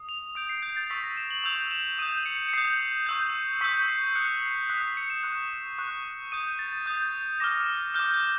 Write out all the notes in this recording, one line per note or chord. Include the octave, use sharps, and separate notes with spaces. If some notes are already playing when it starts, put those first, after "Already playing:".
Already playing: D#6
F7
D#6 G6 D7
C7
G6
A6
C#6 E6 G6 B6
A#6
E7
F#7
C#6 E6 G6 F7
E7
D#6 G6 D#7
C#7
C#7
D#6 G6 C7
C#6 E6 G6
C#6 E6 G6 B6
C7
D#6 F#6 C#7
C7
D#6 F#6 B6
C7
C#7
E7
C#6 F#6
C#6 F#6
D#6 G6 D#7
A6
D#6 G6 A6
D6 F6 A#6
D6 F6 G6
G6